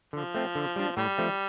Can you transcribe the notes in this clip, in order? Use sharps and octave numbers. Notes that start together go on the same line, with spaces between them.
D3 F3
A3 C4
D3
G3 D4
A2 G3
F3 A3 C4